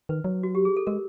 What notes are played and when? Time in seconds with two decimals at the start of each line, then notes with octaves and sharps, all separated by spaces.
0.09 D#3 B4
0.24 F#3
0.43 F#4
0.55 G4
0.65 G#4
0.77 A4
0.87 G#3 A#4